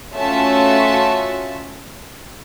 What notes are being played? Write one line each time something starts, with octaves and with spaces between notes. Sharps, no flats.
A3 C#4 F4 F#4 E5 A5